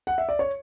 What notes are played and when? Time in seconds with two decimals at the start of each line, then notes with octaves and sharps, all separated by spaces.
0.07 F#5
0.18 E5
0.29 D5
0.39 C#5